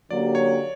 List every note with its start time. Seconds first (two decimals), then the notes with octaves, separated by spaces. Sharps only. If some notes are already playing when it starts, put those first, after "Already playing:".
0.10 D3 F#3 A#3 C#4 G4 D5
0.35 C#5